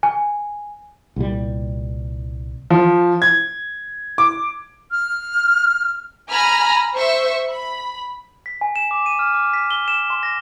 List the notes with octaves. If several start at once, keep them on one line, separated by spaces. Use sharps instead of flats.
G#5
C2 A#2 G3
F3
G#6
D6
F6
G#5 A#5 B5 F6
C5 E5 C#6
B5
B6
G#5
E7
D6
D#7
F6
D6
B6
G7
E7
C6
A#6